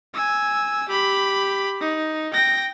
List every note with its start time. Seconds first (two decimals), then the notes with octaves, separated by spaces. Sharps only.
0.14 G#5 E6
0.89 G4 B5
1.81 D#4
2.33 G5 A#6